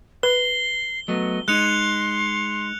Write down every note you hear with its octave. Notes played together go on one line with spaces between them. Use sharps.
B4 C7 G7
F#3 A3 B3 D#5
G#3 D#4 C6 F#6 C#7 F7